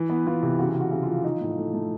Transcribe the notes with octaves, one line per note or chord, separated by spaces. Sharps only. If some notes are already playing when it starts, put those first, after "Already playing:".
Already playing: E3
B3
E3 F4
C3
C#3 F#4
C#3
F#4
C#3
F4
F3
F3 D#4
A2
A3
A3